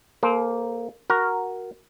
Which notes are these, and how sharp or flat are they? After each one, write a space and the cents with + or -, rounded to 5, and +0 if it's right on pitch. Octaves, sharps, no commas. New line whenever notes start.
A#3 +0 A4 -40 C5 +0
F#4 +0 A#4 +0